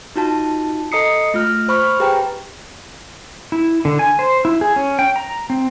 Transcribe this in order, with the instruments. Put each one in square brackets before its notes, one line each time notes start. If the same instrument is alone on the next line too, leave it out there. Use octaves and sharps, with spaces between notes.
[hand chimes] D#4 F4 F#4 A5
A4 D#5 A#5 D#6 C7 C#7
A3 F4 F6
C5 B5 C#6 F6
G4 G#4 B4 G5 A#5
[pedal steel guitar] E4
D3
G#5
C5
E4
G#4
C#4
G5
A#5
C4